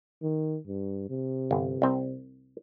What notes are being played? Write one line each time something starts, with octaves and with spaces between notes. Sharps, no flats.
D#3
G2
C3
G1
C2 C4